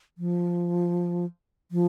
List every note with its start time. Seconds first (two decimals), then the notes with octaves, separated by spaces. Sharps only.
0.18 F3
1.71 F3